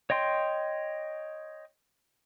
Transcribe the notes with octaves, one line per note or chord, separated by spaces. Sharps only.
C#5 D#5 G5 C6